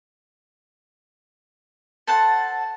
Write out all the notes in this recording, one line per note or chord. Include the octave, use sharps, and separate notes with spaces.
A4 C5 F#5 A5